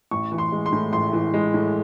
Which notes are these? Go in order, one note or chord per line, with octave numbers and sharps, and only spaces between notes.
A1 C#6
E3
C6
G#3
C6
A2
A1 C6
E3
G#3
A2